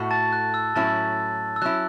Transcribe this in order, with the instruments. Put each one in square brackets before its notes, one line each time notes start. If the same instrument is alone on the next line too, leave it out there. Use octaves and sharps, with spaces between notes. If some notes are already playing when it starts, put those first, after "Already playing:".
Already playing: [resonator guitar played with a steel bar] A2 A3 F#4
[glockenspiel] A5 A6
F#6
E6
[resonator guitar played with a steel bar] A2 F#3 C#4 E4 [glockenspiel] A5 A6
[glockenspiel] E6
[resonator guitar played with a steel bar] F#3 C#4 E4 [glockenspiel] F#6